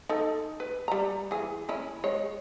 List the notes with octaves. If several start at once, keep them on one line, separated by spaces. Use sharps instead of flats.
D#4 A4
B4
G3 A#5
E3 G#4
C#4 E4
G#3 C#5